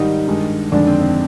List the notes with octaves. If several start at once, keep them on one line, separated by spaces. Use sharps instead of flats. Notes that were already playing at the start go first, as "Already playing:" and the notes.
Already playing: G#2 D#3 G3 D#4
G2 D#3 G#3
F2 D3 D#3 G#3 D4
C4
C4